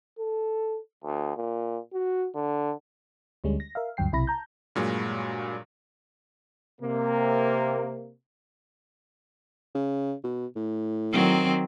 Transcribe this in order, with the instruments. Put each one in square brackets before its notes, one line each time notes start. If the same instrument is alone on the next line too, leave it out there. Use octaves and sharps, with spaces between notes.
[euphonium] A4
D2
A#2
F#4
D3
[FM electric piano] D2 D3 G3 G#3 C#4
A#6
A#4 E5 F5
D2 G2 F#3 G5 C7
B1 C3 E4 B5 A#6
A5 A#5 G6
[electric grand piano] G2 A#2 F#3 G#3
[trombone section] C3 A#3
[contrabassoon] C#3
B2
A2
[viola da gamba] D#3 F#3 C4